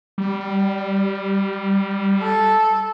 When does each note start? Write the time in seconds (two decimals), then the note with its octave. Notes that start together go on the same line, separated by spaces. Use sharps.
0.18 G3
2.22 A4